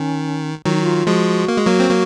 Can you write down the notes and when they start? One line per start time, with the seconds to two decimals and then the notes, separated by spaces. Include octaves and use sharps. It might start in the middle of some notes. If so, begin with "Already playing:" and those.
Already playing: D#3 C#4
0.65 D#3 F#3 F4
0.73 D#4
0.82 F4
1.07 F3 G#3 F#4
1.48 A#3
1.57 G#3
1.66 F#3 A#3
1.80 C4
1.90 F#3 A#3